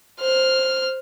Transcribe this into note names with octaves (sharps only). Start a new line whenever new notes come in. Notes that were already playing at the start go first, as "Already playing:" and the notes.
C5 F6